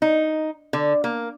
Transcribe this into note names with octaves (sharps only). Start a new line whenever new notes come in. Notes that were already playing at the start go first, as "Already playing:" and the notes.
D#4
D3
A#3